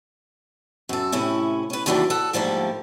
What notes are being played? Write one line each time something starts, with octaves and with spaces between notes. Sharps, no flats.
F#2 A4
A2 C3 C#4 E4
C#4 B4
D#2 G#2 E3 F#3 G3 D4
A4 F#5
G#2 D3 F3 G3 A3 A#3